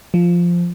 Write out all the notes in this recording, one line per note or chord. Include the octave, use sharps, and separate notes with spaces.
F3